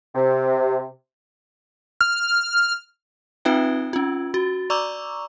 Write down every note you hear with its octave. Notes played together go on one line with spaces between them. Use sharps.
C3
F6
C4 D#4 F4 B4 E5 G5
C#4 F4
F#4
D5 A#5 C#6 D6 E6